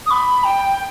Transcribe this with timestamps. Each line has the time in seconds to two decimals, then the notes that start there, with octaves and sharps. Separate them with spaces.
0.06 D#6
0.11 B5
0.44 G5